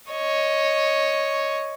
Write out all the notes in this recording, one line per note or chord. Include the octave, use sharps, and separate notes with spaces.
C#5 D#5